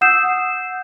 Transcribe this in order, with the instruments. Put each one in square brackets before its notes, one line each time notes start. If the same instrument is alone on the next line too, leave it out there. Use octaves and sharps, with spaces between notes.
[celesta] F#5 D#6 E6 G6 C7 E7